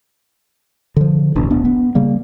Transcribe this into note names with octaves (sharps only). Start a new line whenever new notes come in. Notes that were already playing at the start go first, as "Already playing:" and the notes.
D3 F3
D1 A1 B2 D4
D1 B3 D4
B3
C#3 G3 A#3